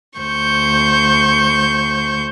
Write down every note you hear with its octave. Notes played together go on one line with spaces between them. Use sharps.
D2 C5 C#6 G6